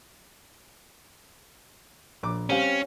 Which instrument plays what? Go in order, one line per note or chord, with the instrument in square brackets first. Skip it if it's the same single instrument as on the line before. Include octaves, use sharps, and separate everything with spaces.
[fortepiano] A#1 D6
[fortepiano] G3 C4 F5 [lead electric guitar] C#4